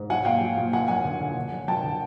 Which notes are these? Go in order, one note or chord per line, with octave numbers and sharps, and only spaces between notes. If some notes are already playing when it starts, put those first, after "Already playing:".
Already playing: G#2
F#3 F#5 G#5
A#2 F5 G5
F#3
A#2
F#3 F#5 G#5
F#2 F#5 G#5
D3
D3
D3
F#2
F#2 G5 A5
D3